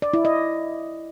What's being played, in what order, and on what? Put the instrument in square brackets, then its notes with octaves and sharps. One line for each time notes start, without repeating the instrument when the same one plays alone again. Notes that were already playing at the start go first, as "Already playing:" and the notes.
[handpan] D5
E4
D#5